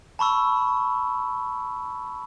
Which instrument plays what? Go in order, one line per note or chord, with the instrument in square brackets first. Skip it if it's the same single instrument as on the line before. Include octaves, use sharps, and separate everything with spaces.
[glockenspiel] A5 B5 C#6 E6